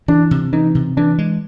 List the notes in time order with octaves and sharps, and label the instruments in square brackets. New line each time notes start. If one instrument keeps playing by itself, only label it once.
[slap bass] E3 [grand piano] D4
[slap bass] C3
[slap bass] E3 [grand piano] D#4
[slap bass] C3
[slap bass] E3 [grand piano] D4
[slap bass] G#3